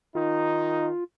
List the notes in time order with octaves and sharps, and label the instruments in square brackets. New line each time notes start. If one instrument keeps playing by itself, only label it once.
[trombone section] D#3 D#4 [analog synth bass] F4